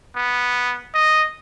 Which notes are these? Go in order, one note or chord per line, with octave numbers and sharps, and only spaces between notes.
B3
D#5